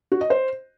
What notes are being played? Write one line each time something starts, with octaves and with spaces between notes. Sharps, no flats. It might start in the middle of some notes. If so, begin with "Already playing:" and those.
F#4
D#5
C5